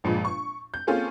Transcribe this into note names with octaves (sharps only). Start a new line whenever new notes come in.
G1 A#2 F3 G#3 B5
C#6
G6
A#3 C4 C#4 F4 G#4 A4